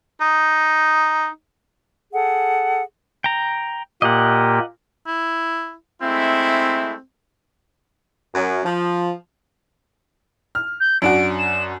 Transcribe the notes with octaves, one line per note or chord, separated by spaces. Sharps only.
D#4
G#4 A4 F#5
G5 A#5
A#2 A#3 G4 D#5 F#5
E4
G#3 A3 C4 E4
F#2
F3
F6
G6
F#2 D4 F#4 D7
E7